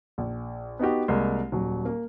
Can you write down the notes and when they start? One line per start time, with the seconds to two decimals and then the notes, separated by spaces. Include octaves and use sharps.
0.18 A#1
0.79 B3 D#4 F#4 G4
1.08 C2 G#3 A#3
1.52 D#1 F#3
1.85 A#3